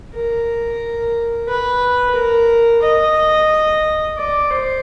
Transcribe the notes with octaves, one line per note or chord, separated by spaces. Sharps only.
A#4
B4
A#4
D#5
D5
C5